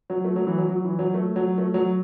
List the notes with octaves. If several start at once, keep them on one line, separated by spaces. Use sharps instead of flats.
F#3
A3
F#3
E3
F#3
F#3
E3
F#3
A3
F#3
A3
F#3